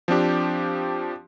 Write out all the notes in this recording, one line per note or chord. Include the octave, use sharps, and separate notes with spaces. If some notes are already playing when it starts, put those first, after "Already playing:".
F3 C4 D4 G4